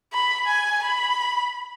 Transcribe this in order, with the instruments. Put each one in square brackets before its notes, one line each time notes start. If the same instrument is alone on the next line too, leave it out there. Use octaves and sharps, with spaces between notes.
[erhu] B5
G#5
B5